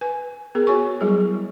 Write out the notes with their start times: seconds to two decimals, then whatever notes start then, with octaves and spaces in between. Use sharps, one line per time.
0.01 B4 G#5
0.55 B3 G#4 A#4
0.67 F#4 C#5 G#5 C#6
1.01 F#3 G3 E4 G#4